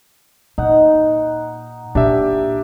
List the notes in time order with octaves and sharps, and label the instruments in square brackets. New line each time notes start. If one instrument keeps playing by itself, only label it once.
[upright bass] A#2 [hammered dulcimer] D#4 F#5
[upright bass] A#2 [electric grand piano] D4 G4 E5